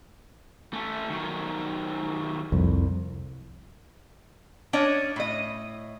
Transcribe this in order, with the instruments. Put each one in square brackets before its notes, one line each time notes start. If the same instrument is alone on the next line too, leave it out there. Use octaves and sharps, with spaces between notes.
[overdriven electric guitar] A3 C#4
D#3 F#3
[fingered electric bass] C2 [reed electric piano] F2
[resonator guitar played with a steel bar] C#4 D4 C#5 D#5
A2 D#5